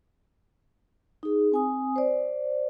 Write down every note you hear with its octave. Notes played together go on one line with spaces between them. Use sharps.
D#4 G#4
C4 G#5 D#6
C5 D5